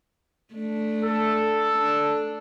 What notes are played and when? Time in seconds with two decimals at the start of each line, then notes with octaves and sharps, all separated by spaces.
0.54 A3 D4
1.03 A4
1.78 D4